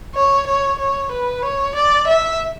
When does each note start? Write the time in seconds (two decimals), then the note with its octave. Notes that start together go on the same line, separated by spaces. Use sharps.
0.15 C#5
0.47 C#5
0.79 C#5
1.11 B4
1.43 C#5
1.75 D5
2.07 E5